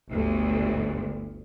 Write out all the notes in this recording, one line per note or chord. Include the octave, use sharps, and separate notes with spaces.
G1 D2